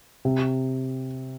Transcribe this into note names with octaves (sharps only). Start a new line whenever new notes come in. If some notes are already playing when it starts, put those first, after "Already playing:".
C3